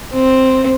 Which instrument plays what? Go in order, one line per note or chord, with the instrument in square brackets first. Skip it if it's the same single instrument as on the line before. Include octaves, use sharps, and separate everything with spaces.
[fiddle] C4